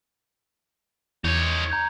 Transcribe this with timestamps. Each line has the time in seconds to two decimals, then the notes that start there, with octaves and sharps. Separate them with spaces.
1.24 E2 D#4 C#5 G#6 F7
1.70 A#5 G6 G#6